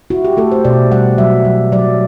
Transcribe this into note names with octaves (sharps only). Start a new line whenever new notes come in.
E4 F#4
G4
A3 A4
C5
B2 D5
G3 F#5
F#3 E5
F#3
F#3 D5